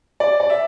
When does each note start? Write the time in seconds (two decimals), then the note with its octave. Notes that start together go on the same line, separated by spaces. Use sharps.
0.20 D5
0.40 D5
0.50 E5